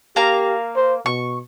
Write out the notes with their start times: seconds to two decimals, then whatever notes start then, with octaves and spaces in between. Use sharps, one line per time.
0.16 A#3 G4 F5 A#5
0.76 C5
1.06 B2 C#6